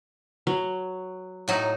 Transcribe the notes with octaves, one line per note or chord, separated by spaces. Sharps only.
F#3
A2 F#3 D#4